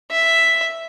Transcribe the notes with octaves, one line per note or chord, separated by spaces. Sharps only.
E5